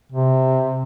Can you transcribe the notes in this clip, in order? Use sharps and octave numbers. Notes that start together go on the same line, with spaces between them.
C3